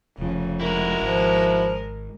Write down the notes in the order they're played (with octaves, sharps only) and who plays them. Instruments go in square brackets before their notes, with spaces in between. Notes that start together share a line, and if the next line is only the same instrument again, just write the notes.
[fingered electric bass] F1 F3 [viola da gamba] C#3
[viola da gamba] G#3 A#4 [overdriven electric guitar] E4 F#4
[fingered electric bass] G#1 [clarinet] F3